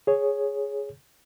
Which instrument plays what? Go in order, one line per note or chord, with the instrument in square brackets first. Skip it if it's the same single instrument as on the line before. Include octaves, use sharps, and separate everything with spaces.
[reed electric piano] G#4 C#5